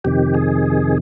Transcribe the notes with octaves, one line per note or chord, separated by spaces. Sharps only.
F2 C3 D#3 G4
G#4